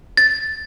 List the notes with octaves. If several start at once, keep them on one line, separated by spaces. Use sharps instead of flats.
A6